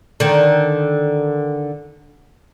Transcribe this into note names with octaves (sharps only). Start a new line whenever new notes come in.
D3 D#3